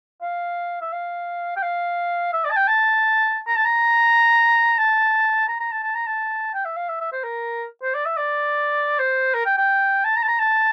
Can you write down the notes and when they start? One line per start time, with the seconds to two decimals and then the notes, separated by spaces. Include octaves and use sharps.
0.22 F5
0.81 E5
0.92 F5
1.56 G5
1.63 F5
2.33 E5
2.44 D5
2.51 A5
2.56 G5
2.68 A5
3.47 A#5
3.56 A5
3.65 A#5
4.78 A5
5.48 A#5
5.60 A#5
5.72 A5
5.83 A5
5.95 A#5
6.06 A5
6.54 G5
6.65 E5
6.76 F5
6.89 E5
7.01 E5
7.12 C5
7.24 A#4
7.82 C5
7.94 D5
8.06 E5
8.17 D5
8.99 C5
9.34 A#4
9.46 G5
9.57 G5
10.04 A5
10.16 A#5
10.23 A5
10.28 A#5
10.39 A5